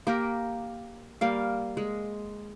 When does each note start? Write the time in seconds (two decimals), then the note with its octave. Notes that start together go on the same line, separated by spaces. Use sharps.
0.07 A#3 G4 A#4
1.21 G3 A#3 F5
1.77 G#3